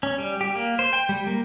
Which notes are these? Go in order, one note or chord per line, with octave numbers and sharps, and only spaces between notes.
C#4
G3
G4
A#3
C5
G5
G3
A#3